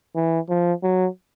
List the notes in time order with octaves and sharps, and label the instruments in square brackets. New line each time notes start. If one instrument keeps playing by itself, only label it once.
[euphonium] E3
F3
F#3